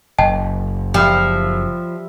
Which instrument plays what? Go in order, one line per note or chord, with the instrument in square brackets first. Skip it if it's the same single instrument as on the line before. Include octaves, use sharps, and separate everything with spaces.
[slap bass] F#1 [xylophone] D#5 G5 A5
[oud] F3 [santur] G3 E5